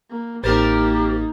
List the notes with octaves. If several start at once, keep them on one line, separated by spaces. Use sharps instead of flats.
A#3
A1 A#3 C4 D#4 G4 A#4 C5 A6